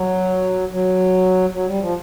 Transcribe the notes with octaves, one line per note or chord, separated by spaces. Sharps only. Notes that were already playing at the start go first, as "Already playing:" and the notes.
Already playing: F#3
F#3
F#3
G3
F3